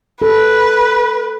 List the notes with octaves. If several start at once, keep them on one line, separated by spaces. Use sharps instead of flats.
A4 B4